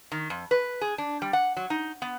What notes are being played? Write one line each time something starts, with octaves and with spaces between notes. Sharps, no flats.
D#3
F2
B4
G#4
D4
G3
F#5
F#3
D#4
B3